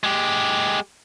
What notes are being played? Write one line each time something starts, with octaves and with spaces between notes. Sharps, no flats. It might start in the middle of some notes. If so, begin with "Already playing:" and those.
G#3 G4